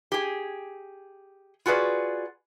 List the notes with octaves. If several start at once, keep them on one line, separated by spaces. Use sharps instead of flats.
G4 G#4
F4 F#4 G#4 B4 D5